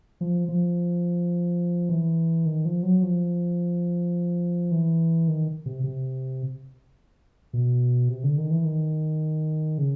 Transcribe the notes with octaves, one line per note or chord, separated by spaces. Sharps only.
F3
F3
E3
D#3
F3
F#3
F3
E3
D#3
C3
C3
B2
C3
D3
D#3
E3
D#3
C#3